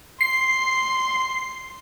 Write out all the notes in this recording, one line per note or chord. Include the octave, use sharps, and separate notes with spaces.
C6 C7